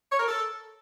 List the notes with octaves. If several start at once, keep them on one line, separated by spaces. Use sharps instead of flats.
C#5
A#4
A4